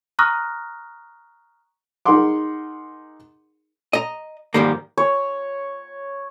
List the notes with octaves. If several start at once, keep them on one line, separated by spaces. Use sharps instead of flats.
A#5 C#6 D#6 F6 F#6 A#6
D#4 G#4 A#4 F#5 C6 D6
D#5 A#5
G#2 D#3 F3 G3 A#3
C#5